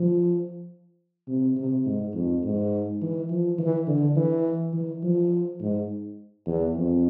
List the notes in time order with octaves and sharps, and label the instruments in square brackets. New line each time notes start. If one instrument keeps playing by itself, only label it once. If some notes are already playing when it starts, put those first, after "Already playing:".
Already playing: [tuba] F3
C3
C3
G#2
F2
G#2
E3
F3
E3
D3
E3
E3
F3
G#2
E2
F2